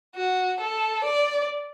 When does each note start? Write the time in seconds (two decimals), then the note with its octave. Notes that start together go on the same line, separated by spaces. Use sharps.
0.16 F#4
0.60 A4
1.04 D5